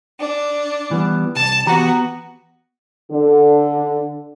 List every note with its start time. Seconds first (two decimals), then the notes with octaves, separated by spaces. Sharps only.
0.20 D4
0.91 E3 G3 B3
1.36 C2 A5
1.67 E3 B3 F#4 G4 A#5
3.12 D3